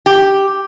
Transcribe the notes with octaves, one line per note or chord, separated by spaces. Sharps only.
G4